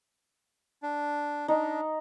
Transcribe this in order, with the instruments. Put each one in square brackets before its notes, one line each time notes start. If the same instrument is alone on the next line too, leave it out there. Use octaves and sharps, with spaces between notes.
[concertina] D4
[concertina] D4 [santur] D#4